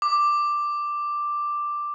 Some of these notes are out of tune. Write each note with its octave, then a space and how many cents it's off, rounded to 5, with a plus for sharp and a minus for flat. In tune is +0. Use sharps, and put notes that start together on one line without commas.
D6 +5